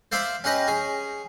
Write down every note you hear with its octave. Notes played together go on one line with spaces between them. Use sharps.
C5 D5 E5 F5 C6
C#4 G4 B4 D#5
C#4 G#4